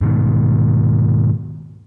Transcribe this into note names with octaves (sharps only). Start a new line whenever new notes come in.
G#2 B2 D#3